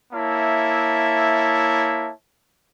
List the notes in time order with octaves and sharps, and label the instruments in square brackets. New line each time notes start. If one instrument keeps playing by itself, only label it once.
[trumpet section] A#3 E4 C#5 E5 A5